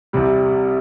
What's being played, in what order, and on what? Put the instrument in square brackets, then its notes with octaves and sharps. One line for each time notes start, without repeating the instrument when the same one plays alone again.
[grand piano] C2 C3 G3